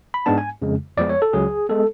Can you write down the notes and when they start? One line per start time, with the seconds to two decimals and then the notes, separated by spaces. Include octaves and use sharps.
0.14 B5
0.26 G#2 G#3 B3 D4 A5
0.38 G#5
0.62 F2 C#3 G#3
0.98 F2 F3 G#3 B3 D5
1.09 C#5
1.22 A4
1.33 C#2 C#3 F#3 G#4
1.69 G#3 B3 A4